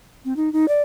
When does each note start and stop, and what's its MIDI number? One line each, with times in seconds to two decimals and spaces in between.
0.25 0.36 60
0.36 0.51 63
0.53 0.68 63
0.68 0.82 74